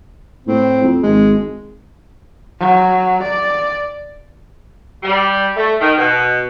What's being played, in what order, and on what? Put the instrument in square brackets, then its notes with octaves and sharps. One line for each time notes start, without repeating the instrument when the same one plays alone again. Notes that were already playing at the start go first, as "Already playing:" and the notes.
[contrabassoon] A2 [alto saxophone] C4
[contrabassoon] F2
[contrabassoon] G#1 [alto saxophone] G#3
[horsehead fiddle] F#3
D5
[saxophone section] G3
A3
D#3
B2